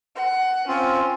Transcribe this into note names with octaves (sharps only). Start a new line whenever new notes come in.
F#5
C4 C#4 F4